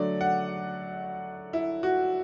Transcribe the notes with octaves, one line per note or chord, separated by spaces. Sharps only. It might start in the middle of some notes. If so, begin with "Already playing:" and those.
Already playing: D3 F#3 A3 D5
F#5
E4
F#4